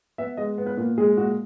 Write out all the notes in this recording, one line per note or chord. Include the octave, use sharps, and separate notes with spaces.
B3 E5
G#3 D#5
B3
B4
A#2 A#4
G#3 G#4
A#2 F#4